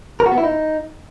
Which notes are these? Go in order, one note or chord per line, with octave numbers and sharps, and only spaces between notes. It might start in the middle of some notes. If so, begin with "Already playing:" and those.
A#4
F#4
B3
E4
D#4